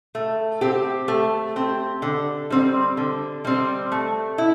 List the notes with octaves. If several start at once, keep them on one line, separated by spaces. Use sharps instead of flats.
A3
C4 G4
A3
C4 G4
D3
G3 C4
D3
G3 C4
A3
E4